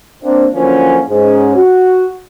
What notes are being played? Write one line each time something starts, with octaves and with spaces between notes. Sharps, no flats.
A#3 C4 D4
D3 F3 F#3 A#3 C#4
G#2 C#4
F#4